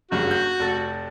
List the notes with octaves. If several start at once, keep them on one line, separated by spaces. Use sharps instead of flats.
F#1 G2 C#3 F#4
G6
F1 A4 A6